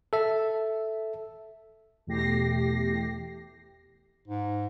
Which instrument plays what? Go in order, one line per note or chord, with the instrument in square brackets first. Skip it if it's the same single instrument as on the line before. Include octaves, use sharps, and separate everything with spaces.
[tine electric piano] A4 E5
[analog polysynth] E2 B2 A3 G4 A#6 C7
[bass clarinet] G#2